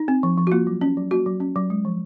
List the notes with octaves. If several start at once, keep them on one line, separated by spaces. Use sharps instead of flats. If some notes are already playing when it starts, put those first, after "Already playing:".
Already playing: D#4
C4
F3
F3
F#4
A#3 F4
F#3
C#4
F#3
A#3 F#4
F#3
C#4
F#3
G#3
F3